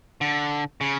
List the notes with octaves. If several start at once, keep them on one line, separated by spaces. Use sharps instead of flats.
D3
C#3